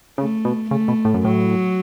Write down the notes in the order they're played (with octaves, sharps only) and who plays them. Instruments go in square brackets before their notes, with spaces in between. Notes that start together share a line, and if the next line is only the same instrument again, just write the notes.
[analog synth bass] C#3 [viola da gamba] A3
[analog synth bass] B2
[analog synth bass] C#3 [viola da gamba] A3
[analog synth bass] B2
A2
F#2
[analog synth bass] A2 [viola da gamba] F#3